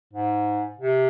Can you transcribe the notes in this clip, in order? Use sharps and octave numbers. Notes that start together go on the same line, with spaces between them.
G#2
C3